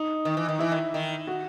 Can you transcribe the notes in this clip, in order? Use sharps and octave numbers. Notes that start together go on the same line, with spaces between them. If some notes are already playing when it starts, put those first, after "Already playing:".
Already playing: D#4
D#3
E3
D#3
E3 E4
D#3
D#3
F#4